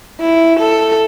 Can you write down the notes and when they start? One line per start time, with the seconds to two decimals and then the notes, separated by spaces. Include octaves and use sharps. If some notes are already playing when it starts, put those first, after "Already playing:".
0.21 E4
0.60 A4